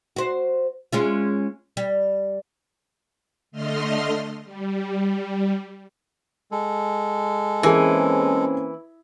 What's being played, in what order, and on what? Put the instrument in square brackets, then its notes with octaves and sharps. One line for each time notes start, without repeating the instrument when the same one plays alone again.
[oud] F#4 C5
G#3 C#4 F4
G3
[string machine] D3 A3 D#5 C6 F6
G3
[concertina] G#3 A4
[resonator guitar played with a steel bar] E3 [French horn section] A#3 C4 C#4 [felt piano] G#4 A#4 G#5